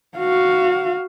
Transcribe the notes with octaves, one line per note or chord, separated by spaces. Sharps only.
F#4 F5